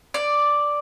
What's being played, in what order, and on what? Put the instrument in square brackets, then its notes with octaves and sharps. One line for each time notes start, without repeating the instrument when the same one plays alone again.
[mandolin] D5